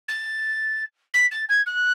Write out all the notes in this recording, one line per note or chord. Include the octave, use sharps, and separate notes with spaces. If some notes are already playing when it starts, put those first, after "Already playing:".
A6
B6
A6
G#6
F#6